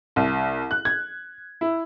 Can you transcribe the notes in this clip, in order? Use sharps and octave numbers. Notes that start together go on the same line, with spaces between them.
C2
F#6
G#6
E4